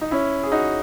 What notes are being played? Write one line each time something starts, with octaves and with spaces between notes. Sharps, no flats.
D#4
C#4 E4
G#4
D#4 F#4